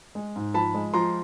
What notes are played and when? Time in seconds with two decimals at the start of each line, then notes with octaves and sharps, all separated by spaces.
0.15 G#3
0.36 G#2
0.54 F3 A5 B5
0.74 G#3
0.94 F3 A#5 C6